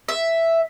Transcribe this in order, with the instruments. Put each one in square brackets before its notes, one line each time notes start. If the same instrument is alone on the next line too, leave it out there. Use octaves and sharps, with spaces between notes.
[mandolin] E5